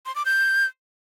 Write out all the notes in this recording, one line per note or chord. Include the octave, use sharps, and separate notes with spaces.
C6
D6
G6